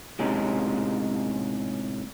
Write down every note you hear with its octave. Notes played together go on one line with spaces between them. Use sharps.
A2 C3 G#3 C#4 D#4